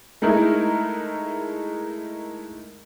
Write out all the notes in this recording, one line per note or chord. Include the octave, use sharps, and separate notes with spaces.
G#3 A3 D#4 E4 A#4